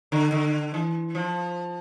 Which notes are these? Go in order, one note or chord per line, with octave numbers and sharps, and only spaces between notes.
D3
D3
E3
F3